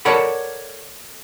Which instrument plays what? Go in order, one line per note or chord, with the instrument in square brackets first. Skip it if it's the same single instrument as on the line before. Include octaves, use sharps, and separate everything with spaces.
[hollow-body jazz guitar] A4 A#4 C#5 D5 F#5 B5